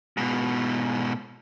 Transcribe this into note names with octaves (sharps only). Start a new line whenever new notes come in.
G#2 B2